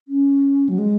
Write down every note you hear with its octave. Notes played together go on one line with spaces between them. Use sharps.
C#4
F#3
G#3